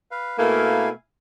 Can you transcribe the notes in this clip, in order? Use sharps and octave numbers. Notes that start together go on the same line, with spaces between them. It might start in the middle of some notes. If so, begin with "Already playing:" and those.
B4 F5
B2 A3 A#3 E4 F5 G#5